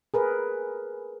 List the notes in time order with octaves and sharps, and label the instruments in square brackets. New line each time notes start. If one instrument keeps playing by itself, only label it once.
[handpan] G#4 A#4 B4